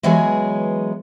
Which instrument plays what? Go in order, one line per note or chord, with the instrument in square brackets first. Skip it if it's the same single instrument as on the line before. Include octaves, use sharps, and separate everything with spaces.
[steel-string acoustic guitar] E3 F#3 G#3 B3 G#4 C#5